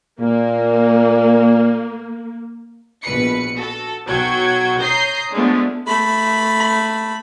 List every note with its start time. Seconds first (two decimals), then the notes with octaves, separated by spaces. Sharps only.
0.20 A#2 A#3
3.04 A#1 B2 B4 C#7
3.56 F#4 A4
4.07 B1 F#3 F#4 F#5 G5 G#6
4.79 C#5 A#5 D#6 G6 A#6 C7
5.33 D3 F3 G#3 A3 B3 D4
5.87 A3 B5